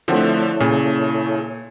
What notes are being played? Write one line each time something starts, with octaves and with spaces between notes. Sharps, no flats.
D3 F3 A3 C4 E4 A4 C#5 F#5
A#2 C#3